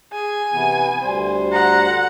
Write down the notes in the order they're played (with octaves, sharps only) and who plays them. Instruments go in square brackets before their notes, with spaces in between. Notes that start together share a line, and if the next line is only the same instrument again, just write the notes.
[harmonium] G#4 [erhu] G#5
[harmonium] C3 E3 B3
D2 G3 C5
[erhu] F#5 [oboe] A#5